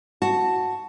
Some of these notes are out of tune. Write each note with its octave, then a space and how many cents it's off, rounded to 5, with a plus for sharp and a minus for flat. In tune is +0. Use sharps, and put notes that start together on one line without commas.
F#4 +0 A5 +0